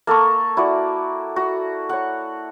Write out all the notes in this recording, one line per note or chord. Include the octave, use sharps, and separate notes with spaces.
A#3 A4 A#5 C#6
E4 F#4 D5
F#4
C#5 F#5